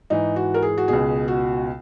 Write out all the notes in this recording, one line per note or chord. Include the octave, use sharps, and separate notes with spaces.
G#2 E3 D#4
F#4
A#4
G#4
F#4
C#2 B2 G#4
F#4